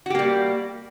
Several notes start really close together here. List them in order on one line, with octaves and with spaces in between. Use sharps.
F#4 G4 A#3 G3